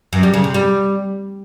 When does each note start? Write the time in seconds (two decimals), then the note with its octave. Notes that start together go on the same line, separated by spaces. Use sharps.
0.13 F#2
0.23 G3
0.33 C#3
0.44 C3
0.54 G3